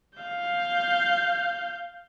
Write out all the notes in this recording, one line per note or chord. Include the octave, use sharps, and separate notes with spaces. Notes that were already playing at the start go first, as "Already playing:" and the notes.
F5 G6